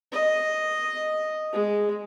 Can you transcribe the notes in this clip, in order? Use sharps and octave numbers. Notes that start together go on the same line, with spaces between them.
D#5
G#3